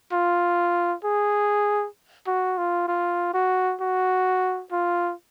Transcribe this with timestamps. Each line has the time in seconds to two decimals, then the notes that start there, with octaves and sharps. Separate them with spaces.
0.12 F4
1.04 G#4
2.27 F#4
2.58 F4
2.88 F4
3.34 F#4
3.81 F#4
4.72 F4